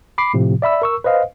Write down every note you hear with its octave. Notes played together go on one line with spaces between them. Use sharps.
B5 D6 C7
A2 C3 F3
D5 E5 B5 E6
A#4 C#6 E6
B4 C5 D#5 F5